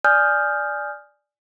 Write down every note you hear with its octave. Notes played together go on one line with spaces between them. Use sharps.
D5 G#5 D#6 F6 G6